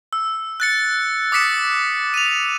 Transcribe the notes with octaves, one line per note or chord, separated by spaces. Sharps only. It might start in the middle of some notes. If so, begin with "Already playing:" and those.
E6
F#6 A6 C#7
D6 D#6 A6 B6 C#7 E7
D#7 F7